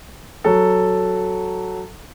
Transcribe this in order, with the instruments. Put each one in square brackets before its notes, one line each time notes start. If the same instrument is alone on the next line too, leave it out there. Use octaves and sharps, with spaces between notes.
[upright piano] F#3 A4